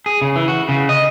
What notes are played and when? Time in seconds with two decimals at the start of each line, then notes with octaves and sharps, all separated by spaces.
0.06 G#4
0.22 C#3
0.36 E3
0.48 F#4
0.69 C#3
0.89 D#5